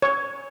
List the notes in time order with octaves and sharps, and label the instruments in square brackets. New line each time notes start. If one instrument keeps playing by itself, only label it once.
[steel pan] C#5